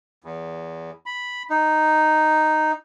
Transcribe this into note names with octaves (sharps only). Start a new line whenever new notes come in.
E2
B5
D#4